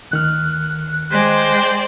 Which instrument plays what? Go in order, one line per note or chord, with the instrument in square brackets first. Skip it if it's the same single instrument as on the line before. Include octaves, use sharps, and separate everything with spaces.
[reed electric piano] D2 D#3 F6 [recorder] F#6
[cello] G#3 [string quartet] C5 D5 G5